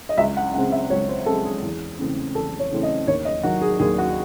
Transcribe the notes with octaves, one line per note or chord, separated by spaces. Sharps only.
D#5
C#2 E5
F#5
C#3 G#3 C4 F#5
E5
C#2 C#5
C5
C#3 G#3 C4 A4
G#4
E2
C#3 E3 A3 C4
E2 A4
C#5
C#3 E3 A3 C4
D#5
D#2 C#5
D#5
D#3 F#3 F#4
G#4
D#2 G#4
F#4